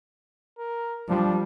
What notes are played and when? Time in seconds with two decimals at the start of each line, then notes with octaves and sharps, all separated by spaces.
0.59 A#4
1.09 F3 G3 D4